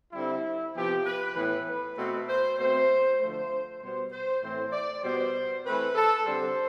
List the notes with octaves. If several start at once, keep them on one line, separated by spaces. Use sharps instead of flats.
D3 G3 C4 E4
C3 F3 B3 G4
B4
A2 E3 B3 B4
B4
B2 A3 C4
C5
B2 A3 C4 C5
D3 F3 A3 C5
B2 G3 B3 C5
C5
A2 E3 A3 C4 C5
D5
B2 G3 B3 C5
E3 A3 C4 B4
A4
D3 G3 C4 C5